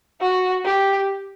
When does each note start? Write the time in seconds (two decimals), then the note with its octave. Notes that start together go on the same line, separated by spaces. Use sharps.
0.21 F#4
0.65 G4